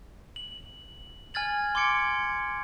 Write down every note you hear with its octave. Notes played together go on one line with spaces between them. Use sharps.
F#7
G#5 F6 G#6 A6 F#7
C6 D6 G#6 C#7 D7